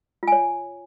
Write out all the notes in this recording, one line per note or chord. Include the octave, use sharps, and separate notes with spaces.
F4 C#5 G#5